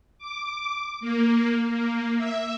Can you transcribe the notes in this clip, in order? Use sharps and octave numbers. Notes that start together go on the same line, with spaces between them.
D6
A#3
A#3
E5